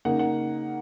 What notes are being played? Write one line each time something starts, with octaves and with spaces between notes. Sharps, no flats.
C#3 A#3 D#4 F#5
F#5